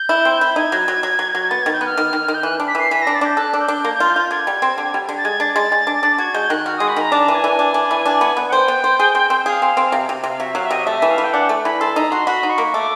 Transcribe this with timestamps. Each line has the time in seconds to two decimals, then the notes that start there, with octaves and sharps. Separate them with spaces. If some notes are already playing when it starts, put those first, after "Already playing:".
Already playing: G6
0.09 E4
0.25 C4
0.41 E4
0.56 D#4 G#6
0.72 F#3
0.88 F#3
1.03 F#3
1.19 F#3
1.35 F#3
1.42 G#6
1.50 B3 A6
1.62 D#3 G#6
1.73 G6
1.81 B3 F#6
1.86 F6
1.97 D#3
2.13 D#3
2.28 D#3
2.35 G6
2.43 E3 F#6
2.60 D4
2.68 B6
2.75 E3 C7
2.91 E3 B6
3.02 D4 A#6
3.15 A6
3.21 D4 G6
3.37 A4 F#6
3.53 D4
3.61 G6
3.68 D4
3.84 A#3
4.00 F4
4.16 F4
4.31 D3 G#6
4.47 G3
4.62 C4
4.78 D3
4.94 G3
5.09 D3
5.18 A6
5.25 G#3 G#6
5.40 D4 A6
5.56 G#3 A6
5.72 G#3
5.87 D4
6.03 D4
6.18 F#4 G#6
6.34 G#3 G6
6.50 D#3 F#6
6.66 F#4 F6
6.77 G#3 D#6
6.88 B5
6.96 D#3 A#5
7.12 D4 A5
7.28 E3
7.35 G#5
7.44 E3
7.59 D4
7.74 D4
7.91 E3
8.06 D4
8.21 B3
8.37 B3
8.48 F#5
8.52 C5 G5
8.68 B3
8.84 C5
9.00 G#4
9.15 C4
9.30 C4
9.46 G#4 F5
9.62 C4
9.77 C4
9.92 C3
10.09 C3
10.24 C3
10.29 F5
10.40 F#3 E5
10.55 F#3 F5
10.66 E5
10.71 C3 D#5
10.86 A3 E5
10.99 E3 E5
11.11 F5
11.18 E3
11.24 G5
11.33 D4 F#5
11.49 A3
11.65 E3 B5
11.80 A4 C6
11.96 D#4 A#5
12.11 F#4 C6
12.27 F#4 B5
12.43 D#4
12.50 C#6
12.58 A#3
12.74 A3 D6